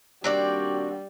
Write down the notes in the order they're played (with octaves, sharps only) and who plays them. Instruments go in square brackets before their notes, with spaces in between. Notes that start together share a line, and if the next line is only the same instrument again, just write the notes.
[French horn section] D#3 A#3 D4 [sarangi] G3 [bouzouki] C4 F#4 D5